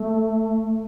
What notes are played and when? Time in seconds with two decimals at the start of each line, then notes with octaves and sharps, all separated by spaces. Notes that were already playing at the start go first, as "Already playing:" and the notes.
Already playing: A3